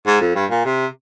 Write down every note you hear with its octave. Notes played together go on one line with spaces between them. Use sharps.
G#2
F2
G2
A#2
C3